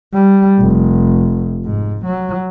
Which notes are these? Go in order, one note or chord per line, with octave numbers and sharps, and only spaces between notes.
G3
F1
G#2
F#3